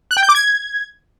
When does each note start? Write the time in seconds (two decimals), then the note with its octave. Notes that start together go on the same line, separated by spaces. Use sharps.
0.11 F#6
0.17 G5
0.23 G6
0.29 D6
0.35 G#6